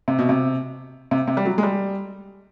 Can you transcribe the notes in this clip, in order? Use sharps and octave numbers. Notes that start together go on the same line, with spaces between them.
C3
B2
C3
C3
C3
G3
F#3
G#3
G3